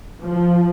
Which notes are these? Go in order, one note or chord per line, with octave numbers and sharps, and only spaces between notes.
F3